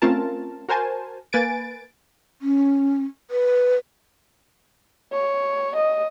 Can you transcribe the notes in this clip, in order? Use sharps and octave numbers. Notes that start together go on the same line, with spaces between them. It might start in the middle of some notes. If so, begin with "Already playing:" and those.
A3 C4 C#4 F4 A#4 A5
F#4 A#4 C5 G#5 A5
A#3 B4 G#5 A6 D7
C#4
B4
C#5
D#5